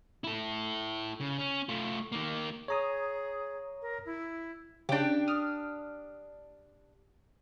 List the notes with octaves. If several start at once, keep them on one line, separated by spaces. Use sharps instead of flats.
E4 A4
C#3
C#4
A3 F4
D#3 A#3
G#4 C#5 A#5 D#6
A#4
E4
C#3 D4 G4 G5
D#6 F6